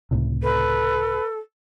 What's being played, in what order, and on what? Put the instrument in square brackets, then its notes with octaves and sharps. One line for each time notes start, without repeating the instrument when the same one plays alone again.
[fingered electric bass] C#2 A2 C3
[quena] A4 [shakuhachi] B4